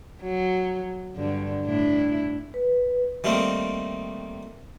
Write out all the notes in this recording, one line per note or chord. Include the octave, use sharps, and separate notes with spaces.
F#3
G2 D3
A2 D4 E4
B4
D#3 G3 A3 A#3 C4